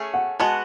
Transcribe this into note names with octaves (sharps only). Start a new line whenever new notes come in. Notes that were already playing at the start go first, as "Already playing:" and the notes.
Already playing: A3 C#4 G#4
F#5
G#3 B3 F#4 A5